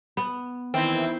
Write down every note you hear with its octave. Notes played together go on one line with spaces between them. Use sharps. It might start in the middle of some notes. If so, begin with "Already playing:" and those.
B3
D#3 E3 C4 E4